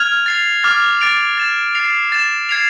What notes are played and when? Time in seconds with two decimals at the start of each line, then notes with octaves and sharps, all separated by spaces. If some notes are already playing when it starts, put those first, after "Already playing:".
Already playing: F6 G#6 F7
0.26 A6 C7 F7
0.63 D6 F6 A6
1.00 D6 A6 D7 F7
1.38 A6 E7
1.75 A6 C7 F7
2.12 A6 E7
2.49 G#6 C7 F7